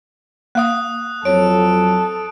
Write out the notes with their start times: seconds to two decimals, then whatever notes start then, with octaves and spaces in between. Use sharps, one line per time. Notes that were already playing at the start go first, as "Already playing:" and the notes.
0.55 A#3 F5 D#6 F#6
1.25 F2 F#3 A4 C#5 D7